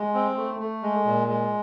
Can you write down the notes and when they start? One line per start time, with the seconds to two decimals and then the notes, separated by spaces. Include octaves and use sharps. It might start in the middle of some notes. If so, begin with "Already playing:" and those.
Already playing: G#3
0.14 C4
0.37 A3
0.59 A3
0.83 G#3
1.05 A#2
1.28 G#3